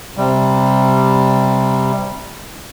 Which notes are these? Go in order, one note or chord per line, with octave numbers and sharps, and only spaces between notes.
C3 G3